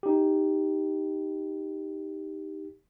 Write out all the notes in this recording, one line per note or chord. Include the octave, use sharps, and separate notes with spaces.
D#4 G4